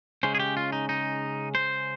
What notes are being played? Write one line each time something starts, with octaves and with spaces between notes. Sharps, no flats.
C#3 G#3 C#4 C5
G#4
G4
F4
D#4
D#4
C5